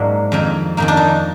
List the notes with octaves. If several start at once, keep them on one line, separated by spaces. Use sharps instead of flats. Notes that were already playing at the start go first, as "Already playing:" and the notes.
Already playing: G#2 F#3 A#3 D4
F2 D#3 A#3
F2 D#3 A#3 D#4
D4
D#4